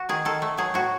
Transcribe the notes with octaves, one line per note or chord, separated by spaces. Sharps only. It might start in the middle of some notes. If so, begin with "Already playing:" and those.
Already playing: F#4
D#3 G#4
D#3 A4
A3
F#3 G#4
A2 F#4